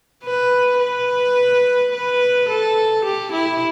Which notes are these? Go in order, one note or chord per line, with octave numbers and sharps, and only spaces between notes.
B4
B4
B4
A4
G4
E4